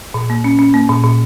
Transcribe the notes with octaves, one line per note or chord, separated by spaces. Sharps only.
A#2
A#3
C#4
C#4
A#3
A#2
A#2